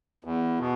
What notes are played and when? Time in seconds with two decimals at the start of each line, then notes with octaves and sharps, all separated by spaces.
0.24 E2
0.60 B2